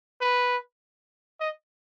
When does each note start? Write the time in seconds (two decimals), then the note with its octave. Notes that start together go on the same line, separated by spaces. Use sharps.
0.21 B4
1.40 D#5